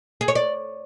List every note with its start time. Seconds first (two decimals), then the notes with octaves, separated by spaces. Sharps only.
0.21 G#4
0.28 C#5
0.35 D5